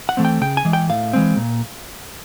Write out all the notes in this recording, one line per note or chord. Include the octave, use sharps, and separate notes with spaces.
F#5
E3 A3 C4
G5
C#3 G5
G#5
E3 G#3
G5
A2 F5
E3 G#3 C4
A#2